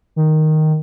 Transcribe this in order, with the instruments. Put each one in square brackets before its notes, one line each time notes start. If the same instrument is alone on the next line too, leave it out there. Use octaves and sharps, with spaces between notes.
[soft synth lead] D#3